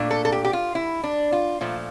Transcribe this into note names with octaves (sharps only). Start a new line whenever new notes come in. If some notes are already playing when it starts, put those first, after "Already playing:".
Already playing: A#2 A3 D4
A4
A4
G4
G4
F4
E4
D4
F4
A#2 F3 A3 F4